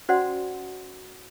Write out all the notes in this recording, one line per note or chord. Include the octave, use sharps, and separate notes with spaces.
C#4 F#4 C5 D5 F#5 C6